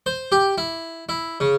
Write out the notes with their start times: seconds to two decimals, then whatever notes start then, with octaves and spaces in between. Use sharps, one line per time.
0.06 C5
0.32 G4
0.58 E4
1.09 E4
1.40 C#3